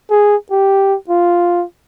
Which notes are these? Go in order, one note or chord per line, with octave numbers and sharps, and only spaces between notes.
G#4
G4
F4